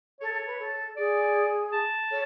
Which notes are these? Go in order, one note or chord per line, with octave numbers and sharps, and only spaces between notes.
A4 C#5
A4
B4
A4
G#4 D5
A5
A4 C#5